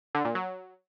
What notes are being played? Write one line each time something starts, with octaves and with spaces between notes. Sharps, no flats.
D3
A#2
F#3